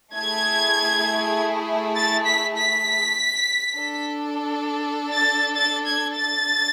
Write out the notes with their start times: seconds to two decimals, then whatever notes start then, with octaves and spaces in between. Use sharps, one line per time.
0.16 A3 E4 G#4 G#6
1.96 A6
2.25 B6
2.55 B6
3.76 D4 A4
5.11 A6
5.55 A6
5.86 G#6
6.16 A6